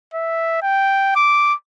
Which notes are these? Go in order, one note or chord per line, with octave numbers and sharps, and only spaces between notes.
E5
G5
D6